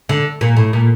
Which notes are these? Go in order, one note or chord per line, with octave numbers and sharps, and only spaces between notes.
D3
A#2
A2
A#2